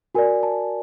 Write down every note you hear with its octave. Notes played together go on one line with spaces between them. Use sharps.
F#4 A#4 D5 G#5
A5